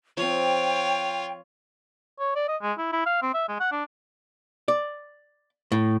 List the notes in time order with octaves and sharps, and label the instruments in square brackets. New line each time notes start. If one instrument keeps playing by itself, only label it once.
[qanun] F3 C4 [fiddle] F4 C#5 [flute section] G5
[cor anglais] C#5
D5
D#5
G#3
E4
E4
F5
C4
E5
G#3
F#5
D4
[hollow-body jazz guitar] D5
A2